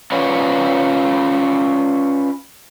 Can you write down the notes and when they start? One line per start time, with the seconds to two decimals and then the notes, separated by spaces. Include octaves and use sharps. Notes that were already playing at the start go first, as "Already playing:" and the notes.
0.12 C#4 F4 B4 C#5 D5 F#5